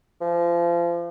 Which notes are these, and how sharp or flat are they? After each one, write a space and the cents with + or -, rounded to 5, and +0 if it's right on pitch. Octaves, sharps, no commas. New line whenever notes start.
F3 -30